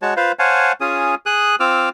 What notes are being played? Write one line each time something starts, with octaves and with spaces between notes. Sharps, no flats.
G#3 F#4 C#5 A5
F4 B4 C5 F5
C5 C#5 F5 F#5 G#5 A5
C#4 F4 G#4 D#6
G#4 D#6 F#6
C4 F4 D6 E6 F6